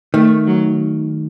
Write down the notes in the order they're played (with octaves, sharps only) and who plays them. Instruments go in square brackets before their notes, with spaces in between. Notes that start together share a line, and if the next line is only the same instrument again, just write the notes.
[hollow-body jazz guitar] D#3 [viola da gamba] A3
[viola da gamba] F#3